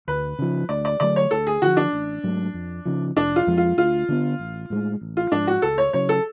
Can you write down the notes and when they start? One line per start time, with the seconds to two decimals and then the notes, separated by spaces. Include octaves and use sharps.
0.08 D2 B4
0.39 C#3 F3
0.69 D2 D5
0.85 D5
1.00 D3 F#3 A3 D5
1.16 C#5
1.31 D2 A4
1.47 G#4
1.62 D3 F3 F#4
1.77 D4
1.93 A1
2.23 G#2 F#3 A3
2.54 F2
2.85 C#3 F3
3.16 F1 D4
3.36 F4
3.47 F2 F3 G#3
3.58 F4
3.77 D2 F4
4.09 D3 G#3 B3
4.39 A1
4.70 A2 G#3
5.01 A1
5.17 F4
5.32 G#2 F3 D4
5.47 F#4
5.62 C#2 A4
5.78 C#5
5.93 C#3 F#3 C#5
6.09 A4